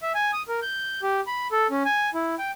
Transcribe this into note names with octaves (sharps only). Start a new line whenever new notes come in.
E5
G#5
D#6
A#4
G6
G4
B5
A4
C#4
G#5
E4
G5